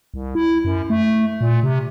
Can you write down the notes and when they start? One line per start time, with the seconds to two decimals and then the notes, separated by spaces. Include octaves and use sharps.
0.14 C2
0.35 E4
0.65 F#2
0.90 A3
1.41 A#2
1.63 C3